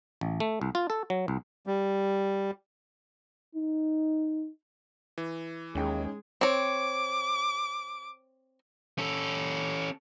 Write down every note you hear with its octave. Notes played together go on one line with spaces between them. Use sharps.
A1
A3
C2
F4
A4
F#3
C2
G3
D#4
E3
D#2 G#3 C#4 D#4 G#4 G5
C4 C#5 D6
C#4 A4